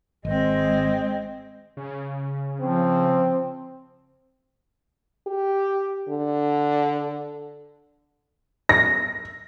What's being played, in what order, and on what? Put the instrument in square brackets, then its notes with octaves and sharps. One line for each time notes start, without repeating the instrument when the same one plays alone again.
[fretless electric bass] G#1 [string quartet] G#3 C4 [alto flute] D#5
[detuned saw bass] C#3
[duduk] F3 [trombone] C4
[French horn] G4
D3
[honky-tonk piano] A#6